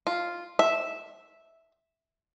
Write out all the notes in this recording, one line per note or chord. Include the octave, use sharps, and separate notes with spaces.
F4
E5